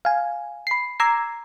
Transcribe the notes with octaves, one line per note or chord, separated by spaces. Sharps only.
F5 G#5
B5 C7
A#5 D6 E6 G#6 C7